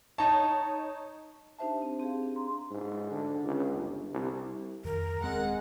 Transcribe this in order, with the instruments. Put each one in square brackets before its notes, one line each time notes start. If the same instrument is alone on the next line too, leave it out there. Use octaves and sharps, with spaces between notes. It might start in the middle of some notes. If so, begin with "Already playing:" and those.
[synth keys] D#4 C#5 [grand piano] A5
[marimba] D4 D#4 G4 C5 E5 A5
C4
C4 G4 G#4 F5
D4
A#5 C6
[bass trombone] G#2
D3
C#2
G1
C2
[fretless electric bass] F2 D#3 [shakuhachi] A#4
[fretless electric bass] D#1 C4 [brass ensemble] G#3 [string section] F#5